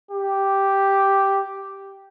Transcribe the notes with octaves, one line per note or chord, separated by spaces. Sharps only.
G4